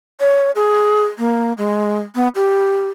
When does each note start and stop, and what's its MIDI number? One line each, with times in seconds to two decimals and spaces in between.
0.20 0.51 73
0.55 1.04 68
1.18 1.53 58
1.58 2.00 56
2.15 2.28 59
2.35 2.88 67